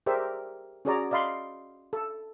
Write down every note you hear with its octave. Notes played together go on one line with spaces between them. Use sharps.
G4 G#4 A#4 C5 D5 E5
C#4 F#4 G#4 C#5 D5 A#5
D5 D#5 F5 B5 C6
A4